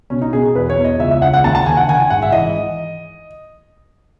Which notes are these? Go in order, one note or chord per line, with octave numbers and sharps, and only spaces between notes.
B2 C#4
D#4
B2 G#4
E2 B4
C#5
E2
D#5
C#2 E5
E5
C#3 F#5
F#5
D#2 A5
A5
D#3 G#5
F#5
D#3 G#5
G#5
G#2 F#5
E5
E3 D#5